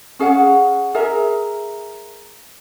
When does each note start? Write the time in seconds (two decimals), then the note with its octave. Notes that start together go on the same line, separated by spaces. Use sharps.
0.19 C#4 G#4 F5 F#5
0.95 G#4 A#4 E5 A#5